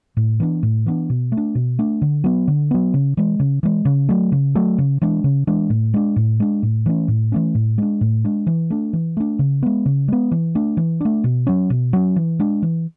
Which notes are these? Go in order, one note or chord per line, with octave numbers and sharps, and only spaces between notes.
A2
E3 B3 D4
A2
E3 B3 D4
B2
A3
D4
B2
A3 D4
D3
F#3 B3
D3
F#3 B3
C#3
E3 G#3
C#3
E3 G#3
C#3
F#3 A3
C#3
F#3 A3
C#3
E3 G#3 D4
C#3
E3 G#3 D4
A2
G#3 D4
A2
G#3 D4
A2
E3 A3 C#4
A2
E3 A3 C#4
A2
G#3 D4
A2
G#3 D4
E3
A3 D4
E3
A3 D4
C#3
G#3 B3
C#3
G#3 B3
E3
A3 D4
E3
A3 D4
B2
F#3 C#4
B2
F#3 C#4
E3
G#3 D4
E3